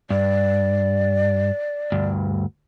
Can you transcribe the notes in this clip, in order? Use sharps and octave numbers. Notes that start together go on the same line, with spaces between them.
G2 D5
D2 G2